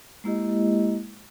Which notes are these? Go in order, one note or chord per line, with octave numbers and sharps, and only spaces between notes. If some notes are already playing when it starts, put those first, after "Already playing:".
G#3 A#3 E4 G4 D#5